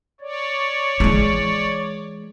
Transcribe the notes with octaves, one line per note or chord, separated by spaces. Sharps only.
C#5 D5
E3 G#3